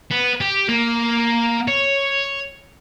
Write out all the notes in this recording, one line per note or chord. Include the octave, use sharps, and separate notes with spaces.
B3
G4
A#3
C#5